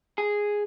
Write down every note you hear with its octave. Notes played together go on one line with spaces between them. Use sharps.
G#4